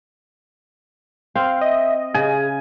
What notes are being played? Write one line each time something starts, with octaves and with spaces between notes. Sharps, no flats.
C4 F5
D#5 E5
C#3 G#4 G#5